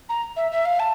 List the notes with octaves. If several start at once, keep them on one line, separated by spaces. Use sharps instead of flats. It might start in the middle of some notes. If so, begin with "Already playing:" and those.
A#5
E5
E5
F5
A5